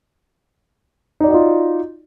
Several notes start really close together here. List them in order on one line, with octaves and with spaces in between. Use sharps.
D#4 D5 F#4 D#5 F4